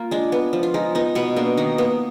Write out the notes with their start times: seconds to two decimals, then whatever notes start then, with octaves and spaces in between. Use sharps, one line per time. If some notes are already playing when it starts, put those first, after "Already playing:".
Already playing: A#3 F4
0.11 G#3 D4
0.32 B3
0.53 F3
0.63 F4
0.74 G#3 D#4
0.95 B3 D#4
1.15 B2 B3
1.36 A#3 D4
1.57 D#3 D#4
1.78 A#3 B3